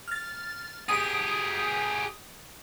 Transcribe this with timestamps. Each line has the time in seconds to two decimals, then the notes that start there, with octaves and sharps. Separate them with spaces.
0.08 F6 A6
0.89 G4 G#4 D#6